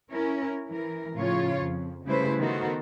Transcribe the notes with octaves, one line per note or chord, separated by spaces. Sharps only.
C#4 E4 A#4
E3 A#4
A2 C#3 F3 F4 C#5
F2
C#3 G3 A3 E4 B4 C5
D#3 B3 F#4 A4 A#4 C5